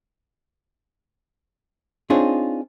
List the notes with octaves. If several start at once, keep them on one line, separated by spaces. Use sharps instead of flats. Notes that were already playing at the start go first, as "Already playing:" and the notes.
C4 D4 D#4 F4 G#4 C#5